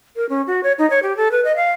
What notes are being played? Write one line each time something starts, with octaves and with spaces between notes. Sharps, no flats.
A#4
C#4
F#4
C#5
D#4
C#5
G4
A4
B4
D#5
F5